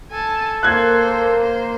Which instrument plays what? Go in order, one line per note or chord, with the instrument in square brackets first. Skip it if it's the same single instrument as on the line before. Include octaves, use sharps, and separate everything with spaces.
[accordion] A4 [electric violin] G#5 A5
[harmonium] A#3 [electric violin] C5 [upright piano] F#6 G#6
[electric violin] C5